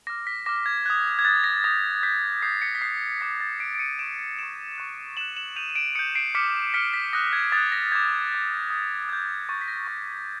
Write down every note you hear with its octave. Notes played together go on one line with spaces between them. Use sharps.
D6 F6 A#6
B6
D6 F6 A#6
G#6
D#6 F#6 G#6
G#6
D#6 F#6 A6
A#6
D#6 G6 A#6
D#6 G6 B6
D#6 G6 C7
B6 C#7
B6
D#6 G6 C7
D6 F#6 B6
A6
D6 F#6 C7 D7
D7
C#7 D#7
C#6 F#6 D7 E7
C#6 F#6 D7 E7
C#6 F#6
C#6 F#6 E7 F#7
E7 F#7
D#6 G6 D#7 F7
D#7
D7 E7
D#6 G6 C#7 D#7
C7 D7
D6 F6 B6 C#7
D6 F6 B6 C#7
B6
D#6 F#6 A#6
G#6
D#6 F#6 A6
A#6
D6 G6 G#6
D6 G6
D#6 G6
D#6 G6 G#6
C#6 F#6 A6
B6
A#6
C#6 F#6 A#6